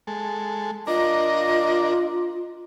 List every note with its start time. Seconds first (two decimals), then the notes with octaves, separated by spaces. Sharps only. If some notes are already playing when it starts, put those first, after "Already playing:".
0.07 G#3 A4
0.87 D4 F4 A#4 D#5